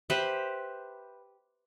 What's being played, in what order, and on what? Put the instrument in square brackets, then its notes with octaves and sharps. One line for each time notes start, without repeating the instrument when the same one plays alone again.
[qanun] G4 B4 C5 E5